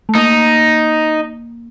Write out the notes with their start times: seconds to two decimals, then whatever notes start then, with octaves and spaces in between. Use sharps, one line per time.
0.09 A3
0.15 A#3 D#4